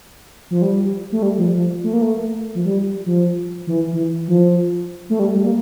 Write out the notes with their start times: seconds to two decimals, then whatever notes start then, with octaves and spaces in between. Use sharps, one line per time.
0.51 F3
0.62 G3
1.12 A3
1.23 G3
1.38 F3
1.53 F3
1.84 A3
1.93 A#3
2.02 A3
2.55 F3
2.65 G3
3.06 F3
3.67 E3
3.93 E3
4.28 F3
5.10 A3
5.19 G3
5.35 G3
5.45 A#3